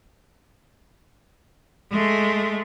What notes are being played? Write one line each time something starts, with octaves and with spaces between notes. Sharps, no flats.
G#3 A3